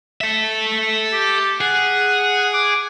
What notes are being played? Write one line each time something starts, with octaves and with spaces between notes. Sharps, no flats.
A4 E5
G4
G#4 F#5
D6